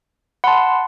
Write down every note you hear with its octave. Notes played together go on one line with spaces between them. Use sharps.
F#5 A5 B5 C6